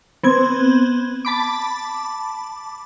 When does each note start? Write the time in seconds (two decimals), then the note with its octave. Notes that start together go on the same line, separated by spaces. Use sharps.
0.23 B3 C4 G#6
1.25 A5 B5 D6